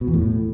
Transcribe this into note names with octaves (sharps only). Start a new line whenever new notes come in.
B2
E2
A2